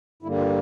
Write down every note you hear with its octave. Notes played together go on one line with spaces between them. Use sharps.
G2 D3 G3 A#3 E4
F4